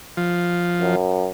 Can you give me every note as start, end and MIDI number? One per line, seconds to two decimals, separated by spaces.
0.17 0.96 53
0.81 1.28 42